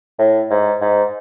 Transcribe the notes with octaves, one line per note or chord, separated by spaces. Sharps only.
A2
G#2
G#2